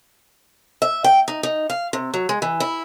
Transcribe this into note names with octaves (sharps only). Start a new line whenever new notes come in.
E5
G5
D#4
D#4
F5
C3
F#3
G#3
E3
E4